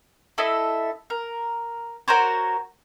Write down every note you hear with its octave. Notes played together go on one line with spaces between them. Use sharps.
E4 A4 D#5 E5
A#4
F#4 A#4 C5 C#5